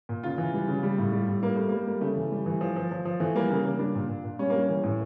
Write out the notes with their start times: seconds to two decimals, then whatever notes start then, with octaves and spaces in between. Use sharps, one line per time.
0.09 A#2
0.23 C#3 F4
0.38 E3
0.54 G3
0.68 C#3
0.83 G3
0.98 A2
1.12 G3
1.28 A2
1.43 G3 A#3
1.56 G3 A3
1.69 G3 A#3
1.87 G3
2.01 C#3 A3
2.16 E3
2.32 G3
2.46 E3
2.61 F3
2.76 F3
2.91 F3
3.05 F3
3.20 E3 A3
3.35 G3 A#3
3.50 C#3 A#3
3.65 C#3 A#3
3.79 G3 D4
3.95 A#2
4.09 A#2
4.24 A#2
4.39 G3 C#4
4.50 G3 A#3
4.59 C#4
4.69 E3
4.84 A2